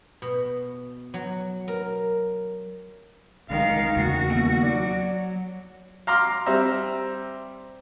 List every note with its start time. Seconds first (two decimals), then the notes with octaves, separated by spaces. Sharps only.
0.22 B2
1.14 F#3
1.68 A#4
3.50 C2 D#3 G#3 F5
3.97 E2 C#3 A#3 F#4
4.30 D#2 B2 D#3
4.63 F#3 D5
6.07 F5 A#5 C6 D6 F6
6.46 G3 C4 E5 A#5